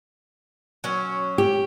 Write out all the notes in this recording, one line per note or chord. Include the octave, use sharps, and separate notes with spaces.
F#3 C#4
G4